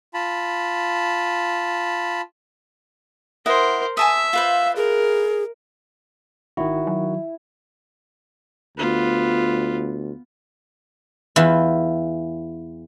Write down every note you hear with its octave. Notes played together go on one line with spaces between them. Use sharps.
F4 A5 B5
E4 A#4 C5 D#5 F#5
E5 G#5 A5 D#6
F4 B4 C5 F5
G#4 A#4
G#1 D#3 E4 F#4
F#3
D2 B3 F4
E2 E3 F4 E5